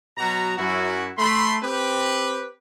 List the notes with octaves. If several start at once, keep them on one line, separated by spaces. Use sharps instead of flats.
B2 F#3 F#4 A#5
F#2 E4 F#4
A3 B5 C6
C4 G4 B4